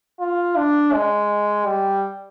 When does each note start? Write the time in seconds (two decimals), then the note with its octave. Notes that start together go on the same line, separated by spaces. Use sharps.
0.20 F4
0.57 D4
0.94 G#3
1.66 G3